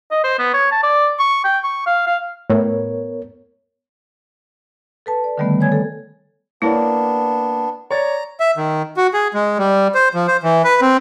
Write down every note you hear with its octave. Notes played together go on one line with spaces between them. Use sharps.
D#5
C5
B3
C#5
A5
D5
C#6
G5
C#6
F5
F5
A2 B3 A#4 C#5
A4 B4 A5
D5
D3 D#3 G3 A3 B3
C#5 G#5 G#6
A4
A#3 B3 D4 E4 C#5 D5
C#5 D5 A#5 A6
E5
D#3
F#4
G#4
G#3
G3
C5
F3
C5
E3
B4
C4